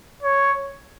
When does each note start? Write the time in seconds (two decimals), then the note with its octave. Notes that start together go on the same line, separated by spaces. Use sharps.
0.23 C#5